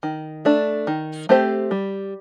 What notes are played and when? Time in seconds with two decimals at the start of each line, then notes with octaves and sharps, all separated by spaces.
0.03 D#3
0.45 A3 D4
0.87 D#3
1.29 A3 C4 G4 C5
1.71 G3